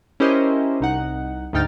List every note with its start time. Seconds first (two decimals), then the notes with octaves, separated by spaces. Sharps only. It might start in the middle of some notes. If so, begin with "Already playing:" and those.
0.20 C#4 E4 G4 A#4 C5 D#5
0.81 C2 D#4 F#5
1.53 D2 G#2 D#4 G5 F6 A6